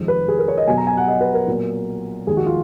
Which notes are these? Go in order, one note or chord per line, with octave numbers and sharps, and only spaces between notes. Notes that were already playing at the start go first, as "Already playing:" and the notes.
Already playing: F1 F2 D#3 G#3
B4
G#4
A#4
C#5
D#5
B1 B2 F#3 G#5
A#5
G#5
F#5
D#5
B4
A#4
B1 A#2 F#3
F1 D#2 D#3 G#3 G#4
F#4
F4